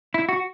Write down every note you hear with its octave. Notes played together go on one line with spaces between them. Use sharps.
E4
F#4